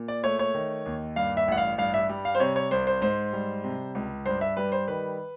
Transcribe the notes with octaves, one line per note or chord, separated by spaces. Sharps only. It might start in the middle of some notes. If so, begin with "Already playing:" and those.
Already playing: A#2
D5
A3 C#5
C#5
D#3
D#2
G2 F5
E5
A1 F#5
F5
G2 F5
E5
G3
F5
C5
C3 C#5
C#5
C2 C5
C5
G#2 C5
G3
C3
C#2
G2 C5
E5
G3 B4
C5
D#3 B4